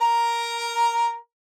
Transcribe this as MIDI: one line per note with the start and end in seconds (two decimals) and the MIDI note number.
0.01 1.16 70
0.01 1.16 82